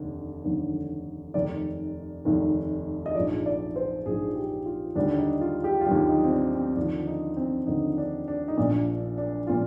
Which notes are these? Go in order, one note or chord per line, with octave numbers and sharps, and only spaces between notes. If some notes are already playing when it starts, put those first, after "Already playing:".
Already playing: F1 D#2 D3
F1 D#2 D3
F1 D#2 D#3 D5
F1 D#2 D#3
D#5
A#1 G#2 F3 D5
D5
C5
A#1 G#2 F3 G#4
G4
F4
D#2 D3 G3 D4
D4
D#4
F4
G4
F4
D#2 D3 G3 G4
D#4
C4
D4
C4
D#2 D3 F3 D4
D#4
C4
D#2 D3 F3 D#4
D4
D4
D#4
A#1 A#2 F3 D4
D4
A#2 F3 F4